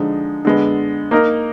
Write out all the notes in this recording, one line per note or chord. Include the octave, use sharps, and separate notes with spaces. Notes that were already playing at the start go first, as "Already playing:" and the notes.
Already playing: D3 F3 G#3 D#4
D3 G#3 B3
A#3 D#4 A#4